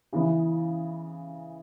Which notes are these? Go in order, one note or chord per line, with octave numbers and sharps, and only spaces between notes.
C#3 E3 B3